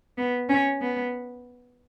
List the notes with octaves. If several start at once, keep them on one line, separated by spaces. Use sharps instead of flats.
B3
C#4
B3